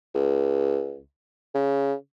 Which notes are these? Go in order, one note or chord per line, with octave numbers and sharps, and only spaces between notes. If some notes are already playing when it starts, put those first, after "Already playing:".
C#2
C#3